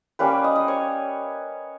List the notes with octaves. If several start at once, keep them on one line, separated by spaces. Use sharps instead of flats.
G3 A#3 C#4 B4
D#5
D#5
C#5